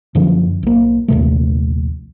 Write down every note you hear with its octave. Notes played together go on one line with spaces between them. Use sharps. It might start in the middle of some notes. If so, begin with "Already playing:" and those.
F#2 D3 F3 C#4
B1 A#3
A#1 D#2 C3 A3